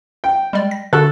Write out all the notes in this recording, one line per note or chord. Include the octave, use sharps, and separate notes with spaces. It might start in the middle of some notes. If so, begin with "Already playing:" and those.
G5
G3 G#3 D5
A#6
D3 F#4 A4 A#4 F#6